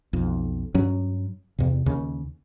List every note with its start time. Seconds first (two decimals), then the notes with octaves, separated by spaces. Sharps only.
0.13 B1 F2
0.75 G2 F#3 C#4
1.59 E2 C3
1.86 D#2 C#3